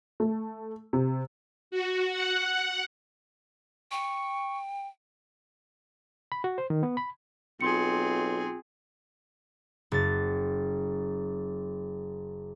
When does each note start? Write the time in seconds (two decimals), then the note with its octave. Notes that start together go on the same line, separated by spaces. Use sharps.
0.20 A3
0.93 C3
1.71 F#4
2.11 F#5
3.91 G5 C#6
6.32 B5
6.44 F#4
6.58 C5
6.70 D#3
6.83 B3
6.97 B5
7.61 B1 C4 F4 G#4 C6 C#7
9.92 F#1 A6